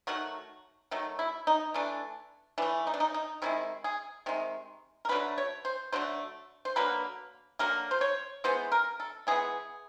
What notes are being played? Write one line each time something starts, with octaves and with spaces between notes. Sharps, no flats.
D#3 F#3 A3 F#4
D#3 F#3 A3
E4
D#4
E3 A3 D4
E3 A3 D4
D#4
D4
D#4
D#4
C3 D#3 G#3 E4
G#4
C3 D#3 G#3
A#4
D3 F#3 A3 B4
C#5
C5
D3 F#3 A3 C5
C5
D3 F#3 A#3 B4
D3 F#3 A#3 A#4
C5
C#5
E3 G#3 B3 C5
A#4
A4
E3 G#3 B3 G#4